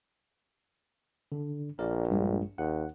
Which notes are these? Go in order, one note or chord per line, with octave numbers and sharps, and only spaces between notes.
D3 D4
A#1 A#4 D5
G2 G3 G#3
D#2 F#5